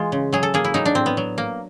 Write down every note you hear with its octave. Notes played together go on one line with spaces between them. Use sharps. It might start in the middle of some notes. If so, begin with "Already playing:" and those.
Already playing: E3 G#3 F4
C#3
F#3 G#4
A4
A#3 G#4
E4
F#3 D#4
D4
A2 C4
B3
F#3
A#3